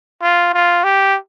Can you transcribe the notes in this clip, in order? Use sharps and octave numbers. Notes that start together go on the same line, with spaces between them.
F4
F4
G4